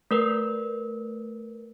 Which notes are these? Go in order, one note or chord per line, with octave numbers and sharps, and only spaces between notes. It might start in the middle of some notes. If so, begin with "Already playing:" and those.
A3 A#4 B4